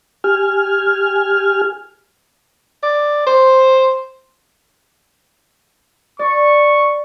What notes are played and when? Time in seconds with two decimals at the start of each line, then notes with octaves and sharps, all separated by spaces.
0.24 G4 G#5 F6
2.83 D5
3.26 C5
6.19 D5 C#6